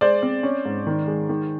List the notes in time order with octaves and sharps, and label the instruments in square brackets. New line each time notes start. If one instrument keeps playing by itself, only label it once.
[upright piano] G#3 C5 D5
C4
C#4
G#2
D#3
G#3
D#3